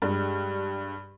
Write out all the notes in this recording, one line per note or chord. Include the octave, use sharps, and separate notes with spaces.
G2 G3 G#3